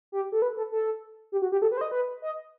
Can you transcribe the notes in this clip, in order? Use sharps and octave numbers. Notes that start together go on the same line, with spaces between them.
G4
A4
B4
A4
A4
G4
F#4
G4
A4
B4
C5
D#5
B4
D#5